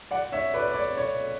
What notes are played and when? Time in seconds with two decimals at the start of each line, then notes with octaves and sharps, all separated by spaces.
0.11 D5 F#5
0.32 C#5 E5
0.54 B4 D5
0.72 D5
0.75 C#5
0.97 C#5